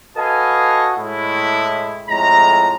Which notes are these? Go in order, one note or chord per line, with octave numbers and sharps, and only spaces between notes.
F#4 A4 B4 D#5 F5 G#5
A2 G#3 E4
F2 A2 G#3 A#5